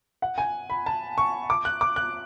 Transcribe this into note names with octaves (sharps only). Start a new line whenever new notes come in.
F#5
G#5
B5
A5
C#6
D6
F#6
D6
F#6